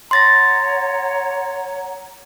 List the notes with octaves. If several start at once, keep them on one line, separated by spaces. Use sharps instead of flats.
C#5 F#5 A#5 C6 A6 A#6